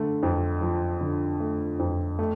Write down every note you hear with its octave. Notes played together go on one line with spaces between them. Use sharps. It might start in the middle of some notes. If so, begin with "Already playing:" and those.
Already playing: D3 A3
F2
F3
D3
A3
F2
A3